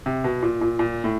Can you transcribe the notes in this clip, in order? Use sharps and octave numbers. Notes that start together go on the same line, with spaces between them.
C3
B2
A#2
A#2
A#2
A2